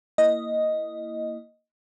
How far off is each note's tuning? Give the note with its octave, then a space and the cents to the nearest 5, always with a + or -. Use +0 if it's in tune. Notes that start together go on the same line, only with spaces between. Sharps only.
A#3 +0 E4 +0 D#5 +0